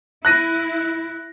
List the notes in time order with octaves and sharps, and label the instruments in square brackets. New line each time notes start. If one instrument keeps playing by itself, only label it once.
[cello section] E4 [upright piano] F#6 A#6 D#7